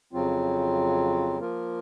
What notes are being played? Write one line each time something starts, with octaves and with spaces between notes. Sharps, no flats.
F2 C#3 F#3 C4 F4
F3 A#3 F4 A#4